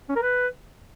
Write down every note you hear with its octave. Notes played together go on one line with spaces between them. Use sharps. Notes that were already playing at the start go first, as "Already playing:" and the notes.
C#4
A#4
B4